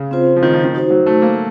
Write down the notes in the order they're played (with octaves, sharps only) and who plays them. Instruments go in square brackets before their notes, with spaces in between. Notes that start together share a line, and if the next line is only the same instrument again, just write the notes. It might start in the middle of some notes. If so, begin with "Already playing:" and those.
Already playing: [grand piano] C#3
[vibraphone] C4 F4 C5
[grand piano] F3
D#3
F3
D#3
[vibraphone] D#4 F#4 C5
[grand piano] F#3
A3
A#3